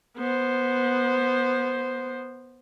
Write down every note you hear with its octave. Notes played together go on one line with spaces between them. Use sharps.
B3 C5